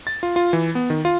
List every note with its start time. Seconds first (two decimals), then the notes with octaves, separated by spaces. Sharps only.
0.07 A6
0.23 F4
0.36 F4
0.53 E3
0.75 B3
0.90 D#3
1.05 F4